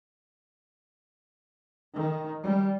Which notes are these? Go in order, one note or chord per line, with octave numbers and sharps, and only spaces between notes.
D#3
G3